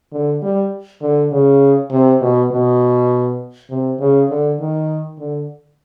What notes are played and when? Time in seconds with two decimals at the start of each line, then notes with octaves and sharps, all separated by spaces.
0.12 D3
0.42 G3
1.01 D3
1.32 C#3
1.91 C3
2.21 B2
2.51 B2
3.70 C3
4.00 C#3
4.29 D3
4.59 D#3
5.19 D3